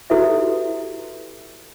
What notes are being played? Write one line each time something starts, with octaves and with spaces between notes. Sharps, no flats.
E4 F#4 G4 A4 B4 E5